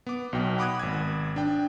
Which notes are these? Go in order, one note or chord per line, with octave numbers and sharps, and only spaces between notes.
B3 D6
B1 B2 G5
F#5 B5 D6 D#6 F#6 G#6
G#1 G#6
D4 G5